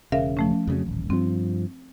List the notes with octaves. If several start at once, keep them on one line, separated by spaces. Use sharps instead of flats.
E1 C#3 A#4 E5 F5
F3 A3 C#4
F2 C#3 F#3
D#1 A1
G2 F3 C4